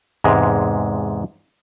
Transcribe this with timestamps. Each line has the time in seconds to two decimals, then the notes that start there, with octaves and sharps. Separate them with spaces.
0.24 E2 G#2 C3 G#3